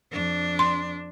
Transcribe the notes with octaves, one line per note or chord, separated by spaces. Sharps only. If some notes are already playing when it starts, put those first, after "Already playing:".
F2 D4
C6